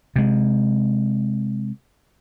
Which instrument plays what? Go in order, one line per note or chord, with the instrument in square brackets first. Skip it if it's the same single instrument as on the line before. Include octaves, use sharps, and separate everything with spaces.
[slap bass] C3 G#3